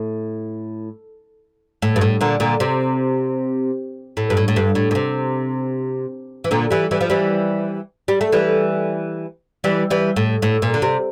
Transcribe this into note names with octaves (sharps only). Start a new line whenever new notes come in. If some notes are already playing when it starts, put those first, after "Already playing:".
Already playing: A2
A2
G2
A2
A#2 D3
A#2 D3
C3
A2
G2
A2
A2
G2
A2
A#2
C3
E3
A#2 D3
E3 G3
E3 G3
F3
E3 G3
G3
A3
E3 G3
E3 G3
E3 G3
A2
A2
A#2
D3
C3